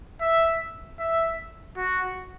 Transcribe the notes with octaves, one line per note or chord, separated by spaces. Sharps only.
E5
E5
F#4